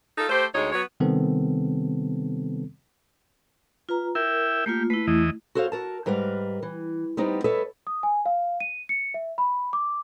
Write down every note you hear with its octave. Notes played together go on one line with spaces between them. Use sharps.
D#4 F4 A4
A3 G4 C5
D2 G#3 D#4 C#5
F#3 B3 C#5
C3 D#3 G3 B3 C4 A4
F4 B4 A#5
E4 A#4 E5 G5
A3 A#3 F4 G4
A3 E4 B4
E2 E3 D#5
F#4 A4 C5 C#5 F5
F#4 A#4 A5
G#2 G3 A#4 B4 F5
E3
G3 B3 C4 D#4
A4 B4 C#5 D#5 E5
D#6
G#5
F5
D#7
C#7
E5
B5
D6